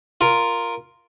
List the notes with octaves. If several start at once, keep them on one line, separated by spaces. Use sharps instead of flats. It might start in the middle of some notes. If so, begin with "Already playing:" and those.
F4 A#4